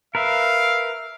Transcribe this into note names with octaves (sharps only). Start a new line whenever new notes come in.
A#4 B4 E5 F5